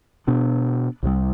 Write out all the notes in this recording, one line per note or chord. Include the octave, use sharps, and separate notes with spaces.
B2 B3 D4
C2 C3 G3